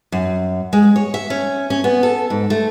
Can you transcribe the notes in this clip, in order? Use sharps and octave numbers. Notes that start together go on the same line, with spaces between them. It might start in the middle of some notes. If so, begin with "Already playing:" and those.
F#2
G#3
C#5
E5
C#4
C#4
B3
A4
G#2
A3